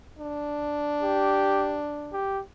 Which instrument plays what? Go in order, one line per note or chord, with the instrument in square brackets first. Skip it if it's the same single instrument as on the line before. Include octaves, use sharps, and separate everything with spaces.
[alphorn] D4
[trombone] G4
G4